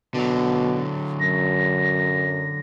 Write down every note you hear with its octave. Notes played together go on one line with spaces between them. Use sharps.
B2 D3 F#3
F#2 A#6